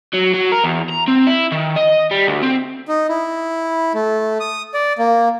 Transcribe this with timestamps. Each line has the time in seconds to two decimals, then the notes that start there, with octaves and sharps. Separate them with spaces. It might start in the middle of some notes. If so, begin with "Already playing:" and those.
0.14 F#3
0.34 F#3
0.52 A#4
0.64 E2
0.89 A#5
1.08 C4
1.27 E4
1.52 D#3
1.76 D#5
2.11 G3
2.27 D2
2.43 C4
2.88 D#4
3.09 E4
3.94 A3
4.40 D#6
4.74 D5
4.98 A#3